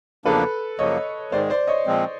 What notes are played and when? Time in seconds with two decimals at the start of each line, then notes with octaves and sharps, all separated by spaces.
0.25 E2 C#3 F3 A#3 D4 A4 B4
0.79 F#2 C#3 F3 A#3 C#5 D#5
1.32 G#2 D#3 G#3 C5 D5
1.50 C5 D5
1.67 C#5 D#5
1.86 A#2 F3 G#3 C4